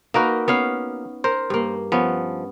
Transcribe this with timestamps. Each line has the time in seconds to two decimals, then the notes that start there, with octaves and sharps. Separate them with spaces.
0.14 A#3 D#4 F#4 A#4 B4
0.48 B3 C#4 F5
1.24 A#4 C5
1.50 G2 A#3
1.92 F3 B3 C#4